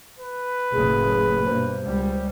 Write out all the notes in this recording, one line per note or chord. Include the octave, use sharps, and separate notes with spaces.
B4
F#1 A2 C#3 G#4
G2 B2 A#3 C5
C#2 G3